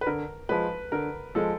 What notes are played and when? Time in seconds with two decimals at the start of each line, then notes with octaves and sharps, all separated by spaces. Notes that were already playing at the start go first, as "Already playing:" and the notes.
0.01 B4
0.07 D3 A#4
0.49 F3 G#3 B4
0.92 D3 A#4
1.35 F3 G#3 A4